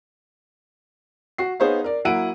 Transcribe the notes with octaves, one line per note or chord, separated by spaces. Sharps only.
F#4 C7
B3 D#4 G#4 C5 C#5 F5
A#4 D5
F#3 A#3 E4 F#5 D7 D#7